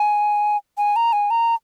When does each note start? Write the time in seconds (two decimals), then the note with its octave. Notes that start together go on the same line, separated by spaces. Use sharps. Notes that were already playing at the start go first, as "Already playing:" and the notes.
Already playing: G#5
0.78 G#5
0.96 A#5
1.13 G#5
1.31 A#5